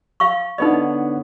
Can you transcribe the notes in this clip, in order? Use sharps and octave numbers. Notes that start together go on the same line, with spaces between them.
F5 C#6
D3 B3 D#4 C#5 D#5